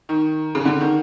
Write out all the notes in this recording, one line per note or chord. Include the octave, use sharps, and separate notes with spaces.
D#3
C#3
D3
D#3